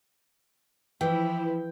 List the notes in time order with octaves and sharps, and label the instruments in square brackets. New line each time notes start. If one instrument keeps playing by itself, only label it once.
[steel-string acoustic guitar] E3 [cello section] F3 E4 [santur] G5